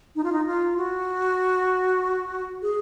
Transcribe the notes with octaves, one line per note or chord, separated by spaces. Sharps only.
D#4
F4
D#4
F4
F#4
G#4